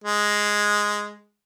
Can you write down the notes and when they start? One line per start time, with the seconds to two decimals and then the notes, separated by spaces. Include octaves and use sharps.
0.04 G#3